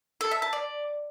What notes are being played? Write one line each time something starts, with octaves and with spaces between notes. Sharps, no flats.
A4
E5
A5
D5